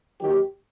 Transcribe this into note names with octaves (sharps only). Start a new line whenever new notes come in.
D#2 D#3 F#3 G4